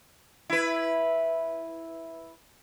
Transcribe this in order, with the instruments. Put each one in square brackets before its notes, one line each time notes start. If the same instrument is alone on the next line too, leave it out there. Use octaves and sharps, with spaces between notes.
[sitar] E4 B4